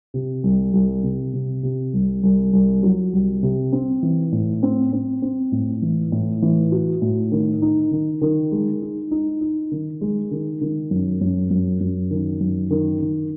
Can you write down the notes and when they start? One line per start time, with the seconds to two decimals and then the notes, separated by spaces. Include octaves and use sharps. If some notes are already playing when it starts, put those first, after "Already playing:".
0.14 C3
0.44 C2
0.73 C2
1.03 C3
1.33 C3
1.63 C3
1.93 C2
2.23 C2
2.53 C2
2.83 F#3
3.13 C2
3.43 C3
3.72 C4
4.03 E3
4.32 A2
4.63 C4
4.93 C4
5.22 C4
5.52 A2
5.82 E3
6.12 A2
6.42 E3
6.72 F#4
7.02 A2
7.32 D#3
7.62 D#4
7.91 D#3
8.22 D#3
8.52 G#3
8.82 D#4
9.11 D#4
9.41 D#4
9.72 D#3
10.01 G#3
10.31 D#3
10.61 D#3
10.91 F#2
11.21 F#2
11.50 F#2
11.81 F#2
12.11 D#3
12.40 F#2
12.71 D#3
13.00 D#3